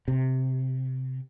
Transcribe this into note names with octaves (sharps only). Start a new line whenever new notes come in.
C3